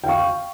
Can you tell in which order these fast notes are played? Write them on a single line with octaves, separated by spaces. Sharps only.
G5 F5 C#6